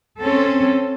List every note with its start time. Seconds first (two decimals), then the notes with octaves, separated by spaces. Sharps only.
0.21 C4 C#4 A4